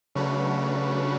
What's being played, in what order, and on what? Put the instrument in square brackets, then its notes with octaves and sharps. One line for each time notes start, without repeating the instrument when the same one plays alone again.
[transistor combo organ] C#3 [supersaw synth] F#3 A3 D4 F#4 B4